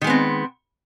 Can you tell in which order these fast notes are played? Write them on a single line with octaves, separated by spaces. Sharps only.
D#3 G#3 B3 C4